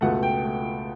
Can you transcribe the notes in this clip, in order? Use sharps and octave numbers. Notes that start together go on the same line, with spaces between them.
C#2 B2 A3 F#5
G5
A3